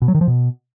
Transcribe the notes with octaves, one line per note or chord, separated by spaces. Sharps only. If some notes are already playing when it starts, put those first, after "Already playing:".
B2
F#3
D#3
F3
B2